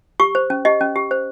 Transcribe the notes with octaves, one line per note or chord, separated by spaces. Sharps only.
G4 C#6
C5
C#4
G4 D#5
C#4
G4
C5